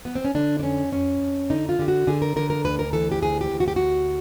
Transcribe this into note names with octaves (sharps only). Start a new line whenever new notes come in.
B3
C4
C#4
D3 D4
D4
F2 C#4
F2 C#4
F2
D3 D#4
F4
D3 G4
F#4
D3 G#4
A#4
D3 A#4
A#4
D2 B4
A#4
E3 A4
G4
D2 G#4
G4
D2
F#4
G4
D2 F#4